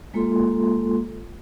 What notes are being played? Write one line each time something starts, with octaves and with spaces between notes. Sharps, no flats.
G#3 A#3 F4 A4 C6